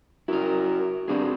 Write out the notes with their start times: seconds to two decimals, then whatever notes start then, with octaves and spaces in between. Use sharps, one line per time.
0.28 F#2 E4 A#4
1.08 G2 C4 F#4 G#4